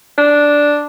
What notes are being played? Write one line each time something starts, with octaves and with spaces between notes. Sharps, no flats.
D4